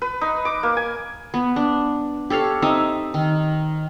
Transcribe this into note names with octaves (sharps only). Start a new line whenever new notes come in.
B4
D#4
D6
A#3
G#5
B3
D4
G4 A4 C#5 F5
C4 D#4 E5
D#3